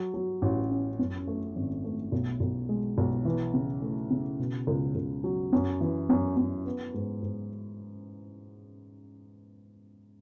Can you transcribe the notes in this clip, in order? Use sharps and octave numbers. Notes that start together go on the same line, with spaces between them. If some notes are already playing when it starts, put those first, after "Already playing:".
Already playing: F#3
F#3
A1
C#4
F#2
A3
G#1
A3
B1
B1
G#3
B1
E3
C#3
A3
C#3
B2
C#2
C#2
F#3
F#2
E3
F#2
F#2
B3
G#2
G#2